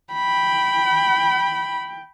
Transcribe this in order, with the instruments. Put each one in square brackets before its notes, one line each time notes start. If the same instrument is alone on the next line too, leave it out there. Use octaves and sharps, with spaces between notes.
[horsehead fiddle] G5 [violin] B5